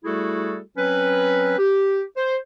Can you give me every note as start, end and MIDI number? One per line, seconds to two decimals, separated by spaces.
0.04 0.59 55
0.04 0.59 57
0.04 0.59 64
0.04 0.59 66
0.04 0.59 68
0.04 0.59 69
0.77 1.57 54
0.77 1.57 60
0.77 1.57 61
0.77 1.57 71
1.58 2.02 67
2.16 2.36 72